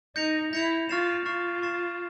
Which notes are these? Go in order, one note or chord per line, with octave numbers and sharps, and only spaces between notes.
D#4 G6 A#6 C#7 F7
E4 G6 A#6 C#7 F7
F4 C#6 F6 A6 C7 E7
F4 C#6 F6 A6 C7 E7
C#6 F6 A6 C7 E7